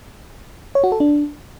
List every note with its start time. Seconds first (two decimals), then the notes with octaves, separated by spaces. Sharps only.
0.75 C#5
0.84 F#4
0.92 A4
1.00 D4